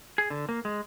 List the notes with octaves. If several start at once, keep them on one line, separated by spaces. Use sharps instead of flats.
G#4
D3
A#3
G#3